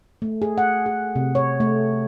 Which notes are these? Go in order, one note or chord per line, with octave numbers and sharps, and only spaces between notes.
A3
G#4
F#5
G#4
C3
C#5
A3